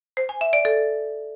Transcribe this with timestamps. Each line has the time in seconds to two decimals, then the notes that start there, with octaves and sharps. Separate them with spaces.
0.17 C5
0.29 G#5
0.41 E5
0.53 D5
0.65 A4